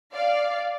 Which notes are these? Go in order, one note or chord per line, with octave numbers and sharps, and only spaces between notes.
D5 F5